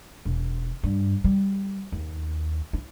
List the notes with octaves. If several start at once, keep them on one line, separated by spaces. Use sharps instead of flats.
E1
G2
G3
D#2
E4